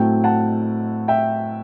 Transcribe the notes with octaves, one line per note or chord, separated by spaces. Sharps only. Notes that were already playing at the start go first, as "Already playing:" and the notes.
Already playing: A2 F#3 A3 C4 G5
F#5 A5
E5 G5